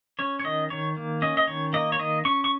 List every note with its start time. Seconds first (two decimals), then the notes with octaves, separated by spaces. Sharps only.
0.19 C#4 C#5
0.40 C#5
0.44 D#3 D#5
0.70 D#3 C#5
0.97 A#3
1.22 C#4 D#5
1.37 D#5
1.47 D#3 C#5
1.73 A#3 D#5
1.92 C#5
1.99 D#3 D#5
2.25 C#4 C#6
2.44 C#6